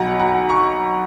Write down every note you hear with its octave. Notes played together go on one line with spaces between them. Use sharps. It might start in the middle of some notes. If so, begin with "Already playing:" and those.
Already playing: B1 B2 F#3 F#5 G#5 A#5 B5
F#5 A#5
A#5 C#6